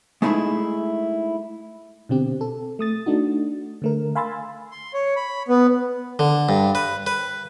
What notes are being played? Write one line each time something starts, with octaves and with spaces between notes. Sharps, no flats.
G#3 A3 D#4 E4 G#4 E5
B2 D3 C4 G4
A4
A3 D#6 A6
A3 D4 D#4 F#4
D3 A3 A#4
F5 G#5 B5 C6 E6 A6
C6
C#5
B5
B3
D3
G2
B4
B4